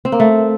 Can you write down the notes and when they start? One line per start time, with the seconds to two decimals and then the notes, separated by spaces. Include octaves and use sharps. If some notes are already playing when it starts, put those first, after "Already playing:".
0.05 C4
0.12 A#3
0.20 A3